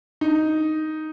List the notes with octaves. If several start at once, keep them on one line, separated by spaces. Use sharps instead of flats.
D#4